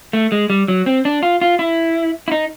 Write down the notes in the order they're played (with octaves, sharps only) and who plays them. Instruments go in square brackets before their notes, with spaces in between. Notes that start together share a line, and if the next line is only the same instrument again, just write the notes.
[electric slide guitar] A3
G#3
G3
F#3
C4
D4
F4
F4
E4
E4
D#4